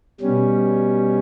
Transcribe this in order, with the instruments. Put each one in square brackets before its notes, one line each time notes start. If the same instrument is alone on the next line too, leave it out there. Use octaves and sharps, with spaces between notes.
[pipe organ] B2 G3 C#4